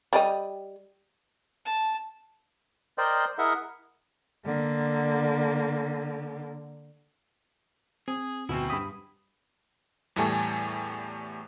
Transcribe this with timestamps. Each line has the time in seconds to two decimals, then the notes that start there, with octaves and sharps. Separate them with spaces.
0.13 G3 G4 D#5
1.65 A5
2.98 A#4 C5 D5 D#5 G5 C6
3.38 E4 G#4 A#4 D#5 E5 F#5
4.46 D3 A#3
8.08 C4 G#4
8.49 D2 B2 C4 C#4 E4
8.70 G2 B5 D#6 B6
10.16 E2 A2 G3 A3 G#5 A5